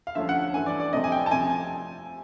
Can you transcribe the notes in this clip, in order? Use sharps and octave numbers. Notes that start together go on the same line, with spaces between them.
F5
D3 F3 A3 C#4 E5
F#5
G2 E3 A3 G#5
D5
D5
C3 F3 A3 C4 D#5
G#5
G5
A5
C3 F3 A3 C4 G#5
G#5